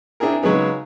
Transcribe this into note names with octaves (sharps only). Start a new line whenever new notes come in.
C4 D4 E4 G#4 A#4
C#3 F#3 G#3 B3 D#4